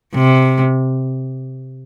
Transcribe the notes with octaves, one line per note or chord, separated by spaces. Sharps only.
C3